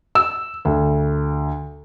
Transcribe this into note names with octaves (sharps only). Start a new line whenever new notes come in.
E6
D2